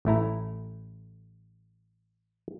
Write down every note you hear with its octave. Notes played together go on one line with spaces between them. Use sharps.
A1 A3 E4 A#5